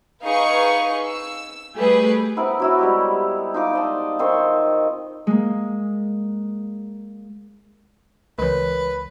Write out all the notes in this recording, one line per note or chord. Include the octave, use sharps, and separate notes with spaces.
D#4 G#4 B4 F5 C#6
E6
G3 A3 G4 G#4 B4
B3 C4 E4 A#4
F#3 E4 F#4
G3 G#3 G4
D#4 F4 D6
D5 D#5 A5
D#3 C4 C6 C#6
G#3 A#3
C#2 E3 G#3 A#4 B4 C#5